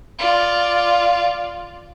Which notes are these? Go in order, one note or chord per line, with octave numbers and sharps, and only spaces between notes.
F4 D5